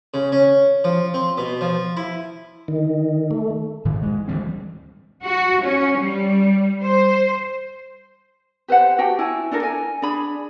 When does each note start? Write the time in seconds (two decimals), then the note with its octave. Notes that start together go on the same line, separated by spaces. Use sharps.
0.14 C#3
0.32 C#4
0.84 F3
1.14 C4
1.38 B2
1.61 F3
1.97 E4
2.68 D#3
3.31 A3
3.85 G#2 D#3 E3
4.02 G#2 G#3
4.28 D2 E3 G3 C4
5.24 F#4
5.65 C#4
5.99 G3
6.82 C5
8.68 G4 B4 C5 F#5
8.98 F#4 G4 G5 A5
9.19 E4 F4 G#5
9.51 D4 E4 A4 A#4
9.63 G#5
10.02 D4 G#4 B5